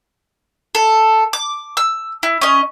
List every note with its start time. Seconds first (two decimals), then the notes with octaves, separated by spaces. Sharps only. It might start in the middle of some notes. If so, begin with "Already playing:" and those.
0.75 A4
1.33 D6
1.77 E6
2.23 E4
2.42 C#4 D#5